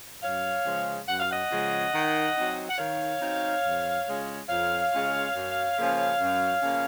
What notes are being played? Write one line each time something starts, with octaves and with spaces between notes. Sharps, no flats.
F#2 C#5 F5
C#3 F3 G#3 C#4
F#2 F#5
F5
D#5 F#5
C#3 F3 G#3 C#4
D#3
F#3 C4 D#4
F#5
D#3 C#5 F5
F#3 C4 D#4
F2
C#3 G#3 C#4 F4
F2 C#5 F5
C#3 G#3 C#4 F4
F#2
C#3 F3 A#3 C#4
F#2
C#3 F3 A#3 C#4